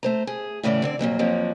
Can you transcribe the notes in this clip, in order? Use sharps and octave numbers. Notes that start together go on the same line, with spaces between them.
A3 C5 A#5
G#4
A2 C#3 E3 A3 C5 D5
D3 C4 D5
F2 A#2 E3 F#3
F2 F3 F#3 A#3